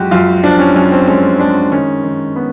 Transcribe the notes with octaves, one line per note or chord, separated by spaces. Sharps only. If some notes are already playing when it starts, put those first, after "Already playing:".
Already playing: F#2 F3 G#3 F#4 G4
F#2 F4
F3 D4
C#4
F#2 C#4
C4
G#3 C#4
G#3 D4
D#3 C#4
D#3
B3